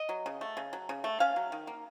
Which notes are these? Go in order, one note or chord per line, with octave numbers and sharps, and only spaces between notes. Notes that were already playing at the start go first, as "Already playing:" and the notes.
Already playing: D#5
F#3
C#3
A3
C#3
F#3
C#3
A3
C#4 F5
F#3
D#3
A#3